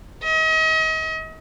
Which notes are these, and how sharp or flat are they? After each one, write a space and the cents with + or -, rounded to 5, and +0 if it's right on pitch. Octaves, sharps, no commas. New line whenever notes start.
D#5 +40